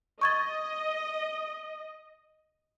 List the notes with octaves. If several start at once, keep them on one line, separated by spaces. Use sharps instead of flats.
D#5 C#6 G#6 A6